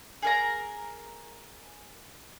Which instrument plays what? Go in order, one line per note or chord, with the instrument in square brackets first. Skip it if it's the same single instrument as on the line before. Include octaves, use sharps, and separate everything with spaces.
[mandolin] G#4 A#4 A#5